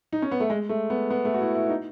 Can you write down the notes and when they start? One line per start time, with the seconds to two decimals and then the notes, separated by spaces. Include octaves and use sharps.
0.13 D#4
0.22 C#4
0.31 B3
0.40 A3
0.50 G#3
0.69 A3
0.90 B3
1.10 B3
1.25 A3
1.34 F#4
1.40 E4
1.55 E4
1.69 D#4